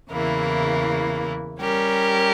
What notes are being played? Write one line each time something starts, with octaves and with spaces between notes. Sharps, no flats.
E2 C#3 E3 A#3 E4
G3 C#4 G4 A#4